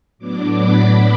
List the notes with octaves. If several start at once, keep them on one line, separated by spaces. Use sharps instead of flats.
A2 F#3 B3 D4 D6
B5